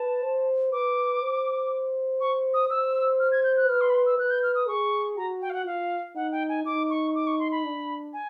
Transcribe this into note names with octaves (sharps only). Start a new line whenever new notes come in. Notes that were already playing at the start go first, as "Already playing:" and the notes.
Already playing: B4 A5
C5
B4 D6
C5
C#6
D#6
C5 E6
F6
G#6
G6
F#6
B4 F6
C6
B5
C6
E6
B4 F#6
G6
F6
D#6
G#4 C#6
F#4 A#5
G5
F5
F#5
F4 F5
D#4 F#5
G5
G#5
D#4 D6
C#6
D6
C#6
C6
B5
D4
G#5